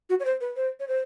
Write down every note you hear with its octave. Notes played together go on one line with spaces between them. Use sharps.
F#4
C#5
C5
B4
C5
C#5
C5